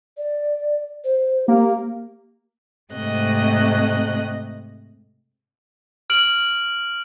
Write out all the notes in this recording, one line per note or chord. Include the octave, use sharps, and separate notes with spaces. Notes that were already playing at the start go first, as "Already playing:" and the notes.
D5
C5
A#3 G4
G#2 C3 A3 D#5 F#6
F6 D7 F#7